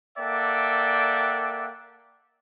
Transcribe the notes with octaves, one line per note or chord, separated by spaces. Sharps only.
A#3 A4 D5 E5 F#5 G5